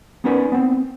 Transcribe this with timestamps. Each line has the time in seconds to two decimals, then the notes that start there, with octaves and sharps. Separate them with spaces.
0.24 B3 C#4 D#4 A#4 B4 D5
0.52 B3 C4